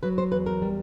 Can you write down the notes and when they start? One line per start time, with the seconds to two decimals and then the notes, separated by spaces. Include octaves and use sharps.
0.03 F#3 B4
0.18 C5
0.32 E2 B4
0.46 A#4
0.62 G3